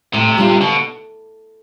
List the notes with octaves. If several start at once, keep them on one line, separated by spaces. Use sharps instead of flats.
A2 C3
G3 D4 F4
B2 D3